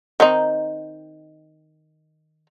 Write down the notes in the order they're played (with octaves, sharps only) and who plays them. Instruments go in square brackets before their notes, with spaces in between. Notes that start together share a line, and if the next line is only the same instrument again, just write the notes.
[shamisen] D#3 C4 D#4